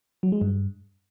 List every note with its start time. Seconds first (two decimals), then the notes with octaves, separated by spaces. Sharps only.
0.23 F#3
0.32 G#3
0.41 G2